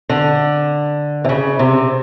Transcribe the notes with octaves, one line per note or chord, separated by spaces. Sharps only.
D3
C3
C#3
C3